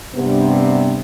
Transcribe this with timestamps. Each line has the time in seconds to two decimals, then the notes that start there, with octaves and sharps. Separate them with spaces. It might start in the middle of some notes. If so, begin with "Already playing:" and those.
0.15 G2 C3 B3